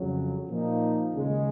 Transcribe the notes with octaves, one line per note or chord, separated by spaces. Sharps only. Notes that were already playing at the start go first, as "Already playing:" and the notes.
Already playing: F2 C#3 F#3
A#2 F3 A#3 D#4
D#2 C#3 G#3